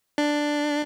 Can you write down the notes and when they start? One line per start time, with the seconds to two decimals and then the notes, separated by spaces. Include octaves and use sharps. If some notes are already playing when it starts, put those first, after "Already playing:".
0.18 D4